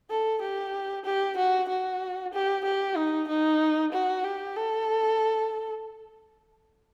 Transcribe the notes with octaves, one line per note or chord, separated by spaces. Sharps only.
A4
G4
G4
F#4
F#4
G4
G4
D#4
D#4
F#4
G4
A4